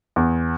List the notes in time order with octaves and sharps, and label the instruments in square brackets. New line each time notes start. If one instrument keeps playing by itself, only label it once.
[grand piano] E2